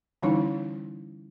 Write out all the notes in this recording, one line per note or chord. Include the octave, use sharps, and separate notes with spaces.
D3 E3 G3 C#4 D#4 E4